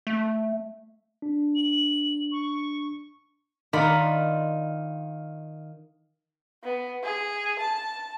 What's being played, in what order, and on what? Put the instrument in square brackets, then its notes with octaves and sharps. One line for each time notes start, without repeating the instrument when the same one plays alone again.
[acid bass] A3
[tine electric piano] D4
[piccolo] F#7
C#6
[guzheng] D#3 F4 D5 F#5 A#5 B5
[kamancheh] B3
G#4
A5